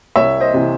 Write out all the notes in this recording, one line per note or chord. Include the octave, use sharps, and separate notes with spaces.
C2 C#5 E5
C5 D#5
C3 E3